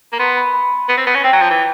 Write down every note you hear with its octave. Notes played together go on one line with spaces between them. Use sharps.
A#3
B3 C6
B5
B5
B3
C4
B3
C#4
C4 G5
F#3
F3
E3